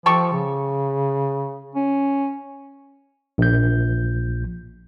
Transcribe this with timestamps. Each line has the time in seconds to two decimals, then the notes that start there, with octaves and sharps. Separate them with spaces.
0.06 F3 G4 A4 C#6
0.33 C#3
1.75 C#4
3.38 A#1 G6